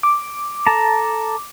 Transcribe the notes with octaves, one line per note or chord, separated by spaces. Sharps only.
D6
A4 A5 A#5